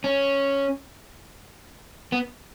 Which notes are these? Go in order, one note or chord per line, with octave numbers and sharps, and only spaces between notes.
C#4
B3